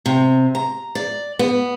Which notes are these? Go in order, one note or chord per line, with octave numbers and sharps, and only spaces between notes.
C3
A#5
D5
B3